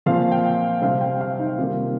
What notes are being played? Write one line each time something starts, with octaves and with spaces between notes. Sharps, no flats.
A#2 F3 C4 F5
G5
C3 G3 C4 F5
G5
F5
D#4
C3 D#3 G3 A#3 F4